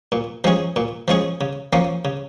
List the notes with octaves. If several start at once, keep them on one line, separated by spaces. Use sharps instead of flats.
A#2
F3 G#3 C#4 G#4
A#2
F3 G#3 C#4 G#4
C#3
F3 A#3 C#4
C#3